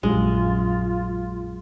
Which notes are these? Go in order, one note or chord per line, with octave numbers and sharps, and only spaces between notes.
A#1 F#2 G#3 D4 F4